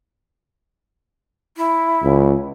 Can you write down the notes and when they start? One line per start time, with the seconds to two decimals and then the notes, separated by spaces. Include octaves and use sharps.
1.57 E4
2.03 C#2